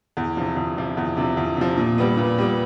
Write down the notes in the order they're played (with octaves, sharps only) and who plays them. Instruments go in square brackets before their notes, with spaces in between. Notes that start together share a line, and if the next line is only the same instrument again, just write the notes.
[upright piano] E2
C3 F3
E2
C3 F3
E2
C3 F3
E2
C3 F3
A#2
G3 B3
A#2
G3 B3